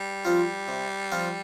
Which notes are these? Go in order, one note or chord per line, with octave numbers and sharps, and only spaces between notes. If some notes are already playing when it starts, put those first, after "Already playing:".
Already playing: G3
F3 C4 F4
C3
F3 C4 F4